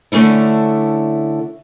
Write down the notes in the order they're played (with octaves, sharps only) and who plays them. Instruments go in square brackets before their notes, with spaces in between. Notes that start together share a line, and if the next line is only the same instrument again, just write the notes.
[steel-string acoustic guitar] D3 A3 C#4 D4 E4